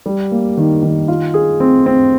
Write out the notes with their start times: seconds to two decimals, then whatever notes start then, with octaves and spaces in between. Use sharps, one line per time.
0.06 G3
0.32 A#3
0.57 D#3
0.83 D#3
1.08 F4
1.34 G#4
1.60 C4
1.86 C4